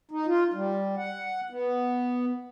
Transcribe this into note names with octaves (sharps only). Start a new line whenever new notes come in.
D#4
F4
G3
F#5
B3